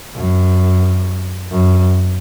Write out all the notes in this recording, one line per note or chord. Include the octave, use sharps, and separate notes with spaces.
F#2
F#2